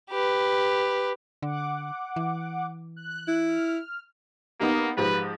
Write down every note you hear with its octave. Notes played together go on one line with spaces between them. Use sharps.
G4 B4
D3 F#5 D6
E3
F#6
E4
F6
A#3 B3 D#4 G4
G#2 F3 G4 B4